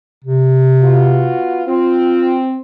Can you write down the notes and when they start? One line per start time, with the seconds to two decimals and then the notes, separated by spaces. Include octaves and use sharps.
0.24 C3
0.81 B3 F4 F#4
1.67 C4 F4